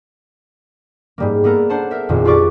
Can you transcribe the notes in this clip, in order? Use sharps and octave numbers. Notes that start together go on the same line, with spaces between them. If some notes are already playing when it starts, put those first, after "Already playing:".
G#2 G3 A#3
A#3 B3 A4 A#4
D4 C5 F#5 A5
A#4 E5
G#1 F2 A#2
F4 G4 B4 D5 C#6 D6